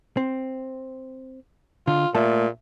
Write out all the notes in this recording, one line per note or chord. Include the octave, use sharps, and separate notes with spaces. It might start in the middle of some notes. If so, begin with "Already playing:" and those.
C4
D3 F4
A#2 A3 A#3 A4